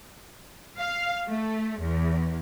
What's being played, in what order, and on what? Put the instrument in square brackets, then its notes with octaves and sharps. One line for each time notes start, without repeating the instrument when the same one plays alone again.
[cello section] F5
A3
E2